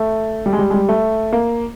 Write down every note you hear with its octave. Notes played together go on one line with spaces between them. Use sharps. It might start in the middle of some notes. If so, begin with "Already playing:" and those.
Already playing: A3
G3
G#3
G3
G#3
G3
A3
A#3